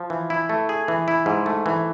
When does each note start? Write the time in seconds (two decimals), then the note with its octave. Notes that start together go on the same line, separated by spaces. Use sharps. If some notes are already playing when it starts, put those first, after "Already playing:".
Already playing: F3
0.10 E3
0.30 E4
0.49 A3
0.69 G#4
0.88 E3
1.08 E4
1.26 G#2
1.46 A3
1.66 E3